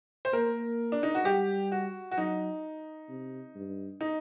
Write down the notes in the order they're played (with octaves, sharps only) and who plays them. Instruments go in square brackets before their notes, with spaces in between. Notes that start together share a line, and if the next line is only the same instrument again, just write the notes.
[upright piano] C5
[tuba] A#3 [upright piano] A#4
[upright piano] D4
D#4
F#4
[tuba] G3 [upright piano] G4
[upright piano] F#4
F#4
[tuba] F#3 [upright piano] D#4
[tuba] C3
G2
[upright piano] D#4